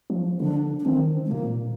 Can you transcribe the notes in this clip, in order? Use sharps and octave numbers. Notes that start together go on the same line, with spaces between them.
F3
D3 D4
D4
D#3 C4
G#3
A#2 A#3